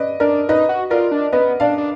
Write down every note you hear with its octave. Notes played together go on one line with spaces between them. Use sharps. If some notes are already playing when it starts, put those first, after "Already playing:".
Already playing: B4 D5 D#5
D4 A#4 D5
D#4 B4 D#5
F#4
F4 A#4 D5
D4
B3 B4 D#5
D4 D5 F5
D4